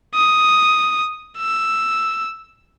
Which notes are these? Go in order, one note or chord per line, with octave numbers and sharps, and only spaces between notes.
D#6
E6